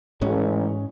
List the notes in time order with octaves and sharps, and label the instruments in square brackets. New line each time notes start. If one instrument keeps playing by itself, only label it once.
[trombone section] A1 [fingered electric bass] G#2 G#3 C#4